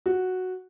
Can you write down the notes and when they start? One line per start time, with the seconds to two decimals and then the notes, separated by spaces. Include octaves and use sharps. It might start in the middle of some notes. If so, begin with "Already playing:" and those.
0.06 F#4